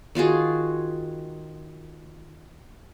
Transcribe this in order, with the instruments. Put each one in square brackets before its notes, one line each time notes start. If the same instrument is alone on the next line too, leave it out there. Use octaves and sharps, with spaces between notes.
[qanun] D#3 F4 F#4 G#4